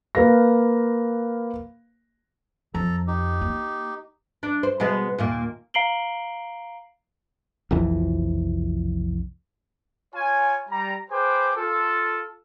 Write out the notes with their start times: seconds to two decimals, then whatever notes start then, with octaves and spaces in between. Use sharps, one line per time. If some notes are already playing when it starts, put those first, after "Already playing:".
0.15 A#3 B4 F5 A#6
2.74 F2 A4 A#5
3.07 D#4 G4
3.41 A#3
4.43 D4
4.63 C5
4.80 B2 G#3 B3
5.18 D#2 A#2 A#3
5.74 F5 A#5 C7 D7 F#7 G7
7.71 F1 B1 F2 E3
10.14 F4 C#5 G#5
10.69 G3 A#5
11.11 G#4 B4 C5 G5 D6
11.56 F4 A4